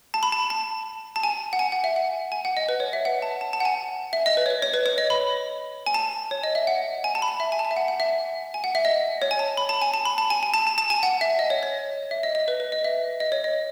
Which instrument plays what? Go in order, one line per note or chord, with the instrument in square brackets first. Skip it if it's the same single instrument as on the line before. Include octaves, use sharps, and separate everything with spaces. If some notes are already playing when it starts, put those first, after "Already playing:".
[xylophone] A5
B5
A5
A5
A5
G#5
F#5
G#5
F#5
E5
F#5
G#5
F#5
D#5
B4
C#5
E5
F#5
A5
A5
A5
F#5
G#5
E5
D#5
B4
C#5
B4
C#5
B4
C#5
D#5
B5
G#5
A5
C#5
D#5
E5
F#5
G#5
A5
B5
A5
E5
G#5
A5
G#5
E5
F#5
F#5
E5
G#5
F#5
E5
D#5
C#5
G#5
A5
B5
A5
G#5
A5
B5
A5
G#5
G#5
A5
A5
A5
G#5
F#5
E5
D#5
C#5
C#5
E5
D#5
D#5
B4
B4
D#5
E5
D#5
C#5
D#5